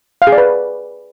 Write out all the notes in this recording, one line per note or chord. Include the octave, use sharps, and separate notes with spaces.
F5
G#4
D5
B4